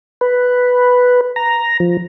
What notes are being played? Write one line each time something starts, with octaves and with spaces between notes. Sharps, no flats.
B4
A#5
F3